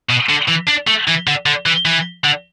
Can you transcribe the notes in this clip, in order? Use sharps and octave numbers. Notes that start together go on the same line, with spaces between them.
B2
D3
E3
D4
A3
E3
D3
D3
E3
E3
D3